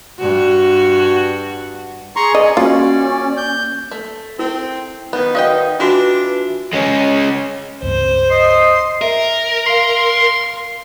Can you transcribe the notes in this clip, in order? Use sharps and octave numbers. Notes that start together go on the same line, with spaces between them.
G2 F#4
G#4 A#5 C6 C#6
D5 D#5
A#3 C#4 F4 F#4
G6
A3
C4 E4 A#4
D#3 B3 B4
F#4 D#5 F5 G5 D#6
E3 D4 F4 F#4
G#3 C#4
C#2 G2 C4 C5
D#5 C6
A#4 E5
F5 C6 C7